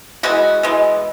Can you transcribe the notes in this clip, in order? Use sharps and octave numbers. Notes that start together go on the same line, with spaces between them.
E3 G#3 B3 F#4
E3 G#3 B3